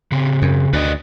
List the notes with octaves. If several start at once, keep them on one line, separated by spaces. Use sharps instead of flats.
C#3 C4
F#2
D2 B4 D5 D#5